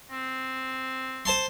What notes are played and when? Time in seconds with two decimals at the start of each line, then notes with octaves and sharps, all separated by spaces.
0.11 C4
1.25 C5 A5 C6